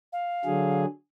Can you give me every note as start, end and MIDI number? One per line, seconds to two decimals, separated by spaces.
0.12 0.83 77
0.45 0.85 50
0.45 0.85 54
0.45 0.85 68